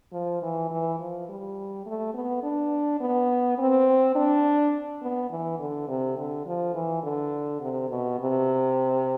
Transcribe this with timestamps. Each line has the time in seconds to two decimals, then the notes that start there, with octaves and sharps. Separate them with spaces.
0.13 F3
0.42 E3
0.71 E3
0.99 F3
1.29 G3
1.86 A3
2.14 B3
2.43 D4
3.01 B3
3.58 C4
4.15 D4
5.02 B3
5.31 E3
5.59 D3
5.88 C3
6.17 D3
6.46 F3
6.74 E3
7.03 D3
7.60 C3
7.90 B2
8.19 C3